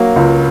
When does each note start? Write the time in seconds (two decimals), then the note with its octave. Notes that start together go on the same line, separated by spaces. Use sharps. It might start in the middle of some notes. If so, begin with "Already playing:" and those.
Already playing: F#3 A#3
0.16 C#2